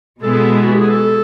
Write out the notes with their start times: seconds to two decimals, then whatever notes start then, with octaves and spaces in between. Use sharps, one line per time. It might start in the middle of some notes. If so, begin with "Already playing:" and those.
0.22 B2 G#3 B3 E4 A4
0.64 F#4
0.72 G4
0.80 G#4
0.89 A4